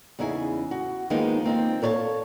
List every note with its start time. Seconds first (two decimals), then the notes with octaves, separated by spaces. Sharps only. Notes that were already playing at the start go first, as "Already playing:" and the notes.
0.19 E2 C#3 C#4 D#4 E4 G#5
0.71 F#4
1.10 D#3 F3 G#3 A#3 B3 D#4
1.44 A#3 C4 D#4 F4
1.82 A4 A#4 C#5 D5 F5 A5